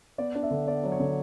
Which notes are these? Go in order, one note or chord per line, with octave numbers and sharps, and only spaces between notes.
B3 D5
D4
E5
D3
B3 D5
F#3
C#5
D3